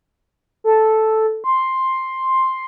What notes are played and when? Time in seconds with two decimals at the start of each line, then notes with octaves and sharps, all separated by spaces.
0.64 A4
1.44 C6